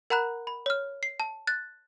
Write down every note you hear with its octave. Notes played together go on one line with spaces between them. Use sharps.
A#4 F#5 A#5 B5 F#6
B5
C#5 F6
C7
A5
F#6 A6